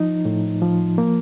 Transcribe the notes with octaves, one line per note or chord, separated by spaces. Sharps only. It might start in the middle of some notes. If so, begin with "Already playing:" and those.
Already playing: F3 D#4
A2
F3
A#3